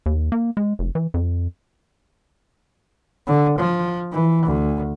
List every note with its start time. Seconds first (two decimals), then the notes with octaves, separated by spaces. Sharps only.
0.06 D#2
0.32 A#3
0.57 G#3
0.79 F1
0.95 E3
1.14 F2
3.27 D3
3.58 F3
4.12 E3
4.46 D2